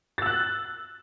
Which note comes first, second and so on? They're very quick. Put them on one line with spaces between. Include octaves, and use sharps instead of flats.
A6 E6 F#6